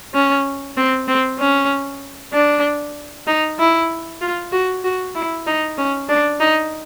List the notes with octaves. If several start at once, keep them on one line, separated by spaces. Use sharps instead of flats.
C#4
C4
C4
C#4
D4
D#4
E4
F4
F#4
F#4
E4
D#4
C#4
D4
D#4